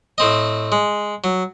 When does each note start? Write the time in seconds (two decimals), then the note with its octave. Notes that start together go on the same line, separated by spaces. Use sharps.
0.18 A2 C4 D#5
0.72 G#3
1.24 F#3